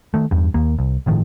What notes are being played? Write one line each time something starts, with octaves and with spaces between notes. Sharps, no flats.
D#3 A3
E2 G2
D#2 A#3
C2
G1 A2 D#3 F3